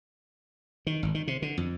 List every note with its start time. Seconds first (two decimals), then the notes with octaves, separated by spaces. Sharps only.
0.87 D#3
1.03 G#1
1.14 D#3
1.27 C3
1.42 D3
1.58 F2